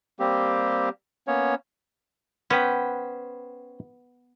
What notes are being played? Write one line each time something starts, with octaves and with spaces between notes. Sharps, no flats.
G3 A#3 C4 G4
A#3 B3 C#4 C#5
B3 C#4 B4 C5 G5